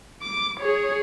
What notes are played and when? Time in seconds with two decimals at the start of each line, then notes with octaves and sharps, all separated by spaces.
0.22 D6
0.60 G#4 C#5